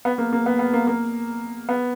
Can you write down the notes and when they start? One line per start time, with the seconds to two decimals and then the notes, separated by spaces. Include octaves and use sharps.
0.05 B3
0.18 A#3
0.33 A#3
0.46 B3
0.59 B3
0.73 A#3
0.87 A#3
1.69 B3